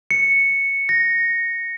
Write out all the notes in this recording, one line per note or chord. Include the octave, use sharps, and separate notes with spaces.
C#7
A#6